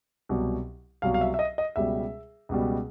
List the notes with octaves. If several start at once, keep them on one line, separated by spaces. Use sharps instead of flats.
C2 B2 F#3
C2 B2 F#3 F5
F5
E5
E5
D#5
D#5
C#2 B2 G3 E5
C#2 B2 G3